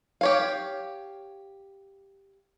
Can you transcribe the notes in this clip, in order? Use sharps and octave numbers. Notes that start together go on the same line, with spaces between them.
G4 C#5 F5